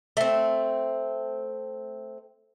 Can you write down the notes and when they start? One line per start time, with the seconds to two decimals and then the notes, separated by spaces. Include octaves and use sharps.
0.17 A3 C4